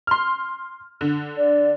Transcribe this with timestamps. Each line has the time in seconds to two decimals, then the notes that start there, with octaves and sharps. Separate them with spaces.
0.07 C6 F6
1.01 D3
1.37 D5